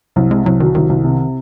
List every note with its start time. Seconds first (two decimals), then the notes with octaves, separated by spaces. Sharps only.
0.16 C2 F#3
0.31 C3 G#3
0.45 C2 F#3
0.60 D#3 F#3
0.75 C2 D#3
0.89 C2
1.04 C3